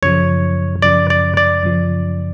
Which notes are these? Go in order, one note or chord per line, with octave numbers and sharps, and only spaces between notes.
F#2 C#3 F3 C#5
F#2 C#3 F3 D5
D5
D5
F#2 C#3 F3